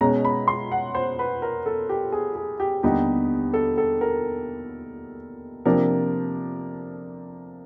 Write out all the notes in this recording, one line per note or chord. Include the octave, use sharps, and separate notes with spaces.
B2 G#3 C#4 A#5
B5
C6
F#5
C5
B4
A#4
A4
G4
G#4
G#4
G4
D#2 D3 G3 B3 D#4 G4
A4
A4
A#4
C3 F3 A#3 D4 A#4